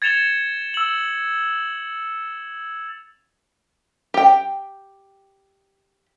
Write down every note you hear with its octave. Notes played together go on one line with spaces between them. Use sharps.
G#6 A6 C#7 E7 F7 G7
E6 F#7
G4 G5